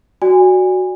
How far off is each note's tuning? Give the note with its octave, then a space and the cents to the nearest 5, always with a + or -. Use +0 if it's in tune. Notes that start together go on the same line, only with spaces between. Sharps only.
F#4 +0 D5 +0 G#5 -25